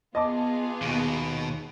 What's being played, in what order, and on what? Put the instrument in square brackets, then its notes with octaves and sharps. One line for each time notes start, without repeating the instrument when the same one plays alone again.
[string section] B3 F4 G#4 [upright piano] D#5 A5 D6
[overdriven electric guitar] D#2 [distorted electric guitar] B2